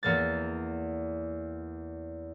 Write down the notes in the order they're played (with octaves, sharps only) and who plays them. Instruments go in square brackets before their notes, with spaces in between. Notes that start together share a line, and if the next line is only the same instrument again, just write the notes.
[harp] E2 A#3 A6